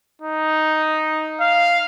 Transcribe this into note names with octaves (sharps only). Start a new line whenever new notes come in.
D#4
F5